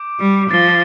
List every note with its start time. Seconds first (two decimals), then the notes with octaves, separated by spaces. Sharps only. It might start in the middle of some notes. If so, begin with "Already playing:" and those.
Already playing: D6 G6 D7
0.20 G3
0.50 F3 A6 C7 G7